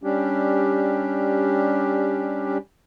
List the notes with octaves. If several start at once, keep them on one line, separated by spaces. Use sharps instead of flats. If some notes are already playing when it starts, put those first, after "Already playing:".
G3 C#4 D4 G4